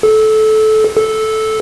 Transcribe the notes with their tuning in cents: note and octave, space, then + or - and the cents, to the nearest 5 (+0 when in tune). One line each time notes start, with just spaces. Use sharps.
A4 -20
A4 -10